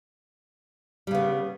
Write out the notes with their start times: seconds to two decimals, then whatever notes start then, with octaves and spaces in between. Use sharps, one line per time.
1.07 G3
1.11 C#3
1.15 B3